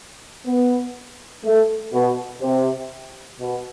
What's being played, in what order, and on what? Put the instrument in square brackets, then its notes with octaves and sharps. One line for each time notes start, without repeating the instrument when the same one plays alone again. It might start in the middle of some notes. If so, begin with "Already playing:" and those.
[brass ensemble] B3
A3
B2
C3
B2